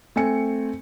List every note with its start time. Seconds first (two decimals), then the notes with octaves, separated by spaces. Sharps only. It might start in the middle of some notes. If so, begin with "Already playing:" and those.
0.16 A3 C4 G#5 C#7